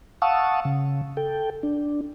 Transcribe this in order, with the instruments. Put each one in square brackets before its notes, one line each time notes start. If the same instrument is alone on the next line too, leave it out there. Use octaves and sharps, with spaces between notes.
[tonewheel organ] F5 F#5 A5 C#6 D#6 E6
C#3
A4 G5
D4